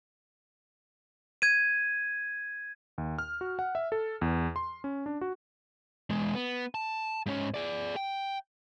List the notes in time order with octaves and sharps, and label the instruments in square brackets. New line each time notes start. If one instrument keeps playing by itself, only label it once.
[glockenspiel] G#6 D#7
[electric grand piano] D#2
F6
F#4
F#5
E5
A4
E2
C6
C#4
D4
F#4
[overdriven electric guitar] E2 G#3
B3
A5
G#2 C#4
G#4 D5
G5